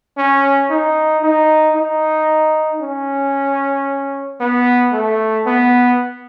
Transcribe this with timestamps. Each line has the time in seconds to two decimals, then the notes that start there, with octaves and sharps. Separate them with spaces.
0.17 C#4
0.70 D#4
1.23 D#4
1.76 D#4
2.81 C#4
4.40 B3
4.93 A3
5.46 B3